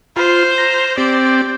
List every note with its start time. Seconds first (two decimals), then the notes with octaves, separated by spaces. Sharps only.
0.16 F4 C5
0.58 A#5
0.98 C4 G4 D5